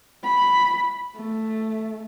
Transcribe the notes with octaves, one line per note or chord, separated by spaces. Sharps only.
B5
A3